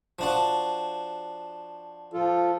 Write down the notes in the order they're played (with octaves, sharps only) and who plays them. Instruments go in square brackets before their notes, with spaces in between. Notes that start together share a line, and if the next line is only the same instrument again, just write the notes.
[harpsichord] F3 D4 F#4
[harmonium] F3 F4 A4